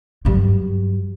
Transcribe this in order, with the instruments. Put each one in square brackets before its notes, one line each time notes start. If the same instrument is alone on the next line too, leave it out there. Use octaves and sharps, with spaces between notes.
[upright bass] G2 F#3